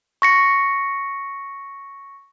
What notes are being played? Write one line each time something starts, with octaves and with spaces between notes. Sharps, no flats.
C#6 A#6 C#7